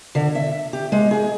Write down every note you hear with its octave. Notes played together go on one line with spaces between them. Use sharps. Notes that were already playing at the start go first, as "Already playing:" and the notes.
D3
E5
G4
G#3
G#4